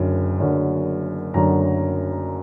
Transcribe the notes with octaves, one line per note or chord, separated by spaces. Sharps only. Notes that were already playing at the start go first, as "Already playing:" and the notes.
Already playing: F#1 F#2 D3
F#1 F#2 D3
F#1 F#2 D3 A#5